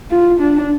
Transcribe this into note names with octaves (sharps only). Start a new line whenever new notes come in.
F4
D4